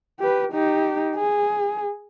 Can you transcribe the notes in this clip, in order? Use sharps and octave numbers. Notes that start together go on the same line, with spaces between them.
G4 B4
D#4 G4
G#4